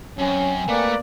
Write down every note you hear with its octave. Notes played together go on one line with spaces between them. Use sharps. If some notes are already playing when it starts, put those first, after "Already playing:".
F#2 C4 C#4 G5 G#5
A3 A#3 B4 D5